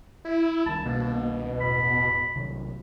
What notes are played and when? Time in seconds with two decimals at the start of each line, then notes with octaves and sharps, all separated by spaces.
0.25 E4
0.66 C2 D#3 A5
0.85 B2 A#3
1.60 E1 A1 B5
2.35 B1 C3 D#3